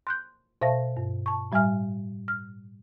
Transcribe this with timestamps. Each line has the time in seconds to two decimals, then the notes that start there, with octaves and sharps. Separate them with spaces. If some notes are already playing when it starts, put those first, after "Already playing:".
0.07 C6 F#6 G6
0.61 B2 C5 E5 F5 A5 A#6
0.97 G2
1.26 A5 C#6
1.52 A2 G3 E5 G#5 F6
2.28 F6